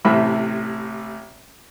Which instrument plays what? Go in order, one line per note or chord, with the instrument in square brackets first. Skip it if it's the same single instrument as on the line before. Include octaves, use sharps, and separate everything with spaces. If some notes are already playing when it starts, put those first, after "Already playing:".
[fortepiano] A1 A2 C3 E5 B5